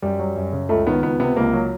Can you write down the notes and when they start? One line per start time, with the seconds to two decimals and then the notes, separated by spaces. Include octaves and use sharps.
0.02 F#2 G3
0.19 F#3
0.36 F#2
0.53 C#3
0.69 C#2 A3
0.87 D#3 B3
1.03 C#2 B3
1.20 C3 B3
1.36 C#2 A#3
1.53 F#3